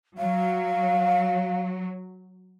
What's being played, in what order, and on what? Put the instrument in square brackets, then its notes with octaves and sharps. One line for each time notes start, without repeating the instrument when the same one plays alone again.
[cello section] F#3 [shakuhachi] F5